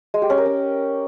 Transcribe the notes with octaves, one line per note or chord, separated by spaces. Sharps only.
G#3
G4
C#4
A#4
C#4